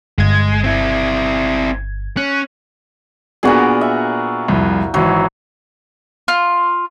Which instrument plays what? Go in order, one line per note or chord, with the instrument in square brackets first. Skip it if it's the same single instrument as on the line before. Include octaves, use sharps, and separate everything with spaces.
[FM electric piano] G1 G#6 [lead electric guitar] G#3
[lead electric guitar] C4 E4
[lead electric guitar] C#4 [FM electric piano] F#6
[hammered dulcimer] A#2 F#4 A#4 [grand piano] B3 D4 G#4
[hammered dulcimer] E5
[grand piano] C2 F2
[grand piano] G#1 E3 [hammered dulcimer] F#3
[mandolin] F4